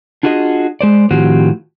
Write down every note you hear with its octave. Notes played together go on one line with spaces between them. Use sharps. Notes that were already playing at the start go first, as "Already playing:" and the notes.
D4 F4 F#4 G#4 D#5
G#3 C5 D5
A2 D#3 F3 C4 F#4 G4